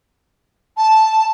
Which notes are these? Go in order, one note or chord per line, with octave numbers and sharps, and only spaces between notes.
A5